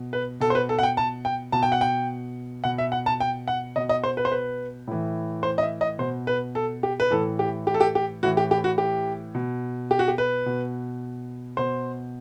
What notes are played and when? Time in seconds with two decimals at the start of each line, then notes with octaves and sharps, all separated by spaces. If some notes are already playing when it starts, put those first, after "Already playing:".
Already playing: B2
0.13 B4
0.40 B2 A4
0.50 C5
0.55 B4
0.69 A4
0.79 F#5
0.83 G5
0.97 A5
1.25 G5
1.52 B2 A5
1.63 G5
1.72 F#5
1.81 G5
2.64 B2 F#5
2.78 E5
2.92 F#5
3.06 A5
3.20 G5
3.48 F#5
3.76 B2 D#5
3.89 D#5
4.04 C5
4.17 B4
4.25 C5
4.31 B4
4.87 A2 E3
5.43 C5
5.58 D#5
5.62 E5
5.81 D#5
5.99 B2 C5
6.27 B4
6.55 A4
6.83 G4
7.00 B4
7.11 A2 E3 A4
7.39 G4
7.67 G4
7.74 A4
7.80 G4
7.95 G4
8.23 A2 E3 F#4
8.37 G4
8.51 G4
8.64 F#4
8.78 G4
9.35 B2
9.91 G4
9.99 F#4
10.08 G4
10.18 B4
10.46 B2
11.57 B2 C5